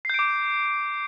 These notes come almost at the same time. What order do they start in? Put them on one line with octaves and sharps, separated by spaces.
C7 G6 D7 D6